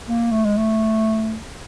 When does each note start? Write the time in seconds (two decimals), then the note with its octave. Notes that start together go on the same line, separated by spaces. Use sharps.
0.09 A#3
0.31 A3
0.45 G#3
0.57 A3